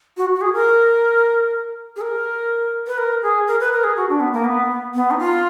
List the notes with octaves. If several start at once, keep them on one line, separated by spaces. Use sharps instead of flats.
F#4
F#4
G#4
A#4
G#4
A#4
B4
A#4
G#4
A#4
B4
A#4
G#4
F#4
D4
B3
A#3
B3
B3
D#4
F4